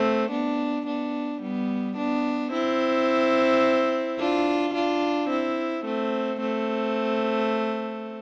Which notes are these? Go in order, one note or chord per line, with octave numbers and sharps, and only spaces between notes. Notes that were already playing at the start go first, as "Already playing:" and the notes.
Already playing: A3 C4
B3 D4
B3 D4
G3 B3
B3 D4
C4 E4
D4 F4
D4 F4
C4 E4
A3 C4
A3 C4